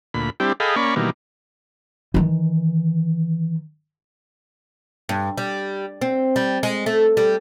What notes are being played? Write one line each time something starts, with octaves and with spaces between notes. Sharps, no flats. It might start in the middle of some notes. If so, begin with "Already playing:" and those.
D2 A#2 B5
G3 C4 D4 E4 G4
G#4 A4 D#5 F5 G5 B5
A#3 C#4 D5 B5 C#6
B2 D#3 E3 G3 A#3
D#3 E3
G2
G3
C4
G3
G#3
A3
G3